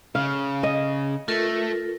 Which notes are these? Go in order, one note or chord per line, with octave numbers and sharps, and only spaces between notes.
C#3 F5
D#5
A3 F4 A4 A#4